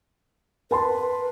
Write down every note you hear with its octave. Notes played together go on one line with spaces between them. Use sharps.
A#4 B4 A5 C6